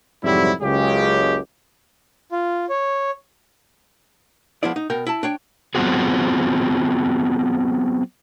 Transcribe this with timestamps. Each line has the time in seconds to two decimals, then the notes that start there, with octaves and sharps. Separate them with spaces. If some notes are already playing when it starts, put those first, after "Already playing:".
0.24 F2 G#2 C3 F#3 G3 E4
0.61 F#1 C#2 F#2 C#3 G#3 G4
2.32 F4
2.70 C#5
4.63 F3 G#3 B3 E4 D5
4.76 D#4
4.90 B2 A#4 G5
5.07 E4 A5
5.23 D4 C#5 G5
5.75 F#3 B3 C4 F4 F#4 G#4